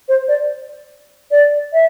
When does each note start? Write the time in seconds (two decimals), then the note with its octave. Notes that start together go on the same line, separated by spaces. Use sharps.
0.09 C5
0.28 D5
1.31 D5
1.73 E5